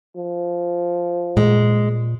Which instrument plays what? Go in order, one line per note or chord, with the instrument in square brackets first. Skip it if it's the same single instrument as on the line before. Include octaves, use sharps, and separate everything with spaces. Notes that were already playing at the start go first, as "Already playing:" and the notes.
[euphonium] F3
[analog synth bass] A#2 [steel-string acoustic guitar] G#3